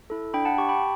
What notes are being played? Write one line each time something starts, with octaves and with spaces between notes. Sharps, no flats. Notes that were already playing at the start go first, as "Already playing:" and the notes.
E4 A4
D4 G5 B5
F#5 A5
G4 A5 C#6
G5 B5